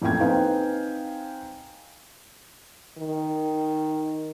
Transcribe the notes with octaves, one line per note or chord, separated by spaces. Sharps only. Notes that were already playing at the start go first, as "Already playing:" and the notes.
A1 F2 A#3 G5 G#6
C4 D#4 B4 F5 G5 G#5
D#3